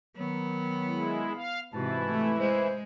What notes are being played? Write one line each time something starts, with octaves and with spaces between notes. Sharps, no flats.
D#3 F#3 B3
G#3 E4
F5
G#2 C3 E3 E4 F#4 B4 A5
A3
G#3 C5